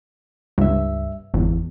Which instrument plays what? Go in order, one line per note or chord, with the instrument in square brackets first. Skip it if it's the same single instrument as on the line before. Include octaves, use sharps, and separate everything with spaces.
[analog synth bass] C#2 [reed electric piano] G2 E5
[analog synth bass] G#1 [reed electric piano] E2